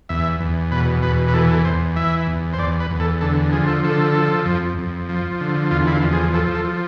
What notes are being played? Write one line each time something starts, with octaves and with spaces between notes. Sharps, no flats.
E2 E5
E2
B2 B4
E2 B4
B4
E3 A4
A4
E2 C5
E3 E5
E2
C5
E2 D5
B4
E2
A4
D3 A4
F3 G#4
A4
D3 A4
F3
F2
F2
F3
D3
E2 F4
E4
F4
F3
G#4
F3 A4
A4
F3